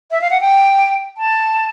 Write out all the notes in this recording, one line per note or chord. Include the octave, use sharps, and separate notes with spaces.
E5
F5
F#5
G5
A5